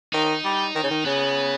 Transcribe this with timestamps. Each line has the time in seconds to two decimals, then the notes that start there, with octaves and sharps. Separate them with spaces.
0.13 D#3 D#4
0.44 G3
0.75 D#3
0.83 C#3
0.91 D#3
1.05 C#3 B3